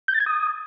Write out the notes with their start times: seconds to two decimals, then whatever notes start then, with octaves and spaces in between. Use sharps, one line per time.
0.08 G6
0.14 A6
0.20 G#6
0.26 D#6